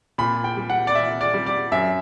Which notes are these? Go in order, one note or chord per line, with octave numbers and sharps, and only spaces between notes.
A#2 B5
G5
G3
F#5
D5
A#2 E5
D5
G3
D5
F#2 E5